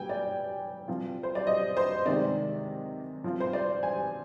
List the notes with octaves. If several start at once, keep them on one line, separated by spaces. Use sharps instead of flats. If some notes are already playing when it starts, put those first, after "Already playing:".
Already playing: G3 A#3 G5 G#5
D5
F3 C4 F4
C5
D5
D#5
C5
C3 D#3 G#3 D#4 D5
F3 C4 F4
C5
D5
G#5